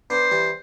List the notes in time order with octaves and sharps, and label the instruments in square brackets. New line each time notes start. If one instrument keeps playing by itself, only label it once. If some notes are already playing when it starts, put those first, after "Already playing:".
[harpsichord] B3 D4 [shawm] C5
[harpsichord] E3 G3